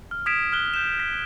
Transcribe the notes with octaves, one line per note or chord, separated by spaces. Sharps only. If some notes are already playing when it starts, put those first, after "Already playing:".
F6
D#6 G#6 B6 D7 E7
F6 F#6 G7
G6 E7
B6